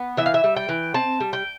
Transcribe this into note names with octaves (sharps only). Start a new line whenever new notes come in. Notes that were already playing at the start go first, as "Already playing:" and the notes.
Already playing: B3
E3 E5
F5
E5
G3
G5
E3
C4 A5
G3
G5